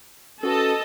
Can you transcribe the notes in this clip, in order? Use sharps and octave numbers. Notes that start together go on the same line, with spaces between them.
C#4 F#4 A4 B4 D#5 A5